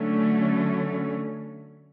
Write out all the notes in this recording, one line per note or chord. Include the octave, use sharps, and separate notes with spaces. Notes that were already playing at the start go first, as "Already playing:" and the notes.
Already playing: D3 F#3 A3 C#4